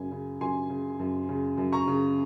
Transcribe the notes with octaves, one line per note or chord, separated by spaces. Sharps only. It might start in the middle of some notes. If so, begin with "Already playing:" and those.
Already playing: F#2 C#3 G#5
C#3
F#2 G#5 C6
C#3
F#2
C#3
F#2
A#5 C#6
C#3